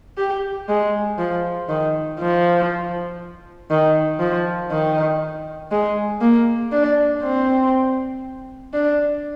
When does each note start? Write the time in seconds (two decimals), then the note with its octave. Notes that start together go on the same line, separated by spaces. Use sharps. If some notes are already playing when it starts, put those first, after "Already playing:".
0.18 G4
0.69 G#3
1.18 F3
1.69 D#3
2.20 F3
3.71 D#3
4.20 F3
4.71 D#3
5.71 G#3
6.21 A#3
6.72 D4
7.22 C4
8.73 D4